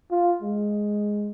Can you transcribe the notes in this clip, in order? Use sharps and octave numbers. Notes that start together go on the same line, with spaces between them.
F4
G#3